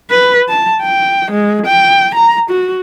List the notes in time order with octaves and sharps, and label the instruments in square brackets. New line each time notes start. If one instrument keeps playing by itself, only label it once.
[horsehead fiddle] B4
A5
G5
G#3
G5
A#5
F#4